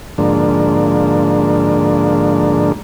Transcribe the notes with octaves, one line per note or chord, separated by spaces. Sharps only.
G#2 D3 F3 A#3 D4